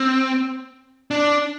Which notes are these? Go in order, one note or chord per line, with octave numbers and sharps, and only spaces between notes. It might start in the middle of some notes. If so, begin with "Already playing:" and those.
Already playing: C4
D4